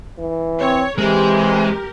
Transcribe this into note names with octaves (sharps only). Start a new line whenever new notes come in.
E3
C4 C#5
C3 E3 G#3 G4 A#4